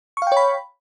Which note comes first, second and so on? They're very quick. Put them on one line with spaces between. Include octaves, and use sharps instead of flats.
C#6 F5 G5 C#5 B5